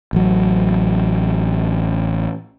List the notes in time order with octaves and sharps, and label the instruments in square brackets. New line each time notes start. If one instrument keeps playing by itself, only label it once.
[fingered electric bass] A1 F#3